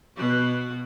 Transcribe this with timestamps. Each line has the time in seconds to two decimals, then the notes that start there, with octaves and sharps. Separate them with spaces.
0.17 B2 F#4